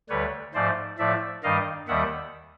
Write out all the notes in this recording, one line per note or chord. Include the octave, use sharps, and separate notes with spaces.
D2 D3 G3 B4 C#5
G#2 F3 A3 C5 D5
A2 F3 A3 D5 E5
G2 D#3 G3 D#5 F5
D#2 D#3 G3 E5 F#5